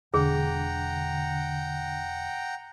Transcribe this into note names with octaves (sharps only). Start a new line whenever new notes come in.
E1 D3 G#4 F#5 G5 A#5